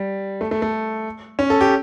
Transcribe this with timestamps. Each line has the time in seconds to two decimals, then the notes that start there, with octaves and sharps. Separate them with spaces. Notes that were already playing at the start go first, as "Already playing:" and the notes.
Already playing: G3
0.41 A3
0.51 A3
0.62 A3
1.39 C#4
1.50 A4
1.61 G4